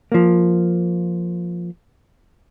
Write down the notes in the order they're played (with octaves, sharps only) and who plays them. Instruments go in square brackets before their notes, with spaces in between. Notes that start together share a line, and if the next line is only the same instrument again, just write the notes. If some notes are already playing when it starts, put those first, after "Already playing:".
[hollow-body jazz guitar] F3 A#3